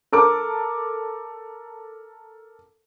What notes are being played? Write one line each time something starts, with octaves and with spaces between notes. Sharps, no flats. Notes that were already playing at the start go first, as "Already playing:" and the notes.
A4 A#4 D6